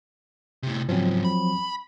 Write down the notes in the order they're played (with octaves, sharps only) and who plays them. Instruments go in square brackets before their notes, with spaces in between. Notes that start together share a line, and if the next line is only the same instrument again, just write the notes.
[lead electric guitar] A2 C3
[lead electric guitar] C#2 G#2 [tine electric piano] F3 F#3 C4
[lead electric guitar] B5